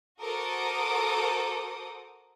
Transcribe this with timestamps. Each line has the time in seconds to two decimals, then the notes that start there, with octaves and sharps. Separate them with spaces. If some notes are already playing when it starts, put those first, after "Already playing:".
0.20 F#4 A4 A#4 C5 D6 D#6